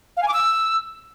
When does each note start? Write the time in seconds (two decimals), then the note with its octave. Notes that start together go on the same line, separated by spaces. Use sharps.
0.17 F5
0.22 G#5
0.28 D6
0.34 E6